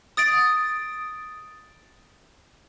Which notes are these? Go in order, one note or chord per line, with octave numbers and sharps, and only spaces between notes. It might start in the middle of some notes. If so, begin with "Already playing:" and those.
D#6 A6 D7